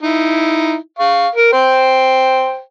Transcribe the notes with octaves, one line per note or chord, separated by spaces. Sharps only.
D#4 E4
F5 C#6
A#4
C5 G5